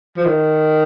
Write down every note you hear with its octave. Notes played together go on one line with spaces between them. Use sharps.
F3
D#3